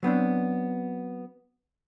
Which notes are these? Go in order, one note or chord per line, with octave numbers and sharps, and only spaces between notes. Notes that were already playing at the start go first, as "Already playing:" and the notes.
F#3 B3 C4 D4